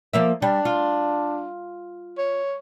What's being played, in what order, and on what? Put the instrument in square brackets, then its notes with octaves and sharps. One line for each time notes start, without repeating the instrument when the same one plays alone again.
[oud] F3 A#3 E5
[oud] G3 [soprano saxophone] D4
[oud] F4
[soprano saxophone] C#5